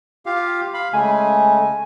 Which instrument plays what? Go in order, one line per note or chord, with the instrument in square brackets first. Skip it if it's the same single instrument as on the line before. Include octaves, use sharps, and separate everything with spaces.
[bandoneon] F4 G4 F5
F5 B5
[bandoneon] C#3 G#3 A3 [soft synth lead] G#5